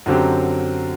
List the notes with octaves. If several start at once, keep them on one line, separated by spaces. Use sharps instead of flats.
F#2 D3 F#3 C4 G4